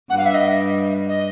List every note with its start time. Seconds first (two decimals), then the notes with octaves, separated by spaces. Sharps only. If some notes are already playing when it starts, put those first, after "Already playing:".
0.10 G2 G3 F#5
0.18 F5
0.26 E5
0.34 D#5
1.09 D#5